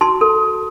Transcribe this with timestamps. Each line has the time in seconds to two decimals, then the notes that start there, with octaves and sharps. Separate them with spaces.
0.01 F#4 A5 C6
0.21 A4